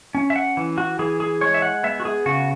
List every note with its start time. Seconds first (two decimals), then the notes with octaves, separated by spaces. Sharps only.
0.15 C#4
0.30 E5
0.36 F#5
0.57 E3
0.78 F#4
0.99 E3 G#4
1.20 G#4
1.41 G#3 C#5
1.54 E5
1.62 F#5
1.84 B3 E5
2.00 F#4
2.05 G#4
2.26 C#3 F#4